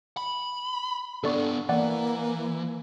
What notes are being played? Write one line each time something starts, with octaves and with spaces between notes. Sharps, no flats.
B5
D3 B3 D4 A4 D5 C#6
E3 A#3 D5 F#5